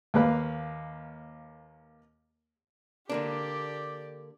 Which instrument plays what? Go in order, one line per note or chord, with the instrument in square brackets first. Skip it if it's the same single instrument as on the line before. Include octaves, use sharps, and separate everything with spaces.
[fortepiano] D#2 A#3 B4 F5
[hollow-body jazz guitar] D3 A#3 D4 [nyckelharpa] G4 D5